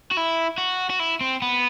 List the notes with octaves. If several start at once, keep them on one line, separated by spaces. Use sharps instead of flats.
F#4
E4
F#4
F#4
E4
C4
B3